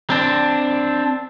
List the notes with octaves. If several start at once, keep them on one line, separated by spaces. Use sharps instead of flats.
C4 D4